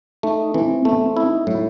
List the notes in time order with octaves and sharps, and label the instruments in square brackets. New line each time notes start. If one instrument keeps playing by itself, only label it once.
[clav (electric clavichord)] A3 [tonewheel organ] D#4
[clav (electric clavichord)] E3 [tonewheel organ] C4
[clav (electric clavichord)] A3 [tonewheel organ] B3
[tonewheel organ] C4
[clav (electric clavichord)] E4
[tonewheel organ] D#4
[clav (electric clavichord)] A2 [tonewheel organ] F#3